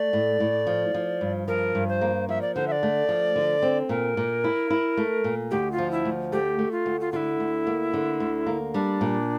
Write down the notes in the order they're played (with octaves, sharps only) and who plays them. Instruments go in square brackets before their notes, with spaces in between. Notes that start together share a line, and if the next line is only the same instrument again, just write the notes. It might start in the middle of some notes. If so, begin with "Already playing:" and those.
Already playing: [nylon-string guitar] A3 [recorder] D5
[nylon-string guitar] A2
A2
F3
F3
G2
[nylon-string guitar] F3 [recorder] A#4
[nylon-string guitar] G2
[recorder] C5
[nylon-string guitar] A#3
[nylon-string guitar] F3 [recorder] E5
[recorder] D5
[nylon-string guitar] D3 [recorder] C5
[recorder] E5
D5
[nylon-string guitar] A3
F3
D3
C4
[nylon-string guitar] A#2 [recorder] A#4
[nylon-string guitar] A#2
E4
E4
A3
A#2
[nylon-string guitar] D2 [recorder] G4
[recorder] F4
[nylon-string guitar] F3
[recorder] E4
[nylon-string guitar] D2
[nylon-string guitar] A3 [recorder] G4
[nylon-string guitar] A3
[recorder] F4
[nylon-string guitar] D2
[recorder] F4
[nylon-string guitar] D3 [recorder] E4 F4
[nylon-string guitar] D2
A#3
D3
D2
A#3
[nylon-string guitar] G3 [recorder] D4
[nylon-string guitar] A#2